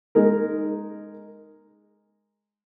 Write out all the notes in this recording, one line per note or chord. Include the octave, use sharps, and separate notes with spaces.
G#3 D#4 A#4